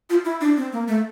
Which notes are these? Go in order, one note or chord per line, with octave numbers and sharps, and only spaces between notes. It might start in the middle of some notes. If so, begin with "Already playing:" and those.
F4
E4
D4
C4
A#3
A3